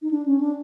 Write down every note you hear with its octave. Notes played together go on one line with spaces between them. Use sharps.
D#4
D4
C#4
D4